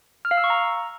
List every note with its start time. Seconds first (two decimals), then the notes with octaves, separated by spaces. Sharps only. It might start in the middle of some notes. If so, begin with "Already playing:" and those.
0.25 F6
0.31 F5
0.37 E6
0.44 C#6
0.50 A#5